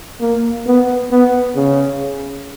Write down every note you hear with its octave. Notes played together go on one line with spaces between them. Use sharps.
A#3
B3
B3
C#3